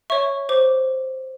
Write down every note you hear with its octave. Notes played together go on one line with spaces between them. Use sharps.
C#5 E5 C#6
C5 D6